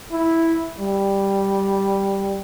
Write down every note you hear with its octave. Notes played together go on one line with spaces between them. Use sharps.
E4
G3